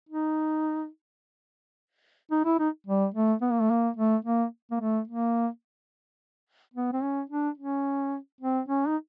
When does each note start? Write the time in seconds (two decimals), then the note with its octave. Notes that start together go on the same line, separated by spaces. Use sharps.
0.09 D#4
2.31 D#4
2.45 E4
2.59 D#4
2.87 G3
3.14 A3
3.41 B3
3.51 A#3
3.60 A3
3.70 A#3
3.97 A3
4.25 A#3
4.71 A#3
4.81 A3
5.08 A#3
6.74 B3
6.93 C4
7.02 C#4
7.30 D4
7.58 C#4
8.41 C4
8.69 C#4
8.88 D#4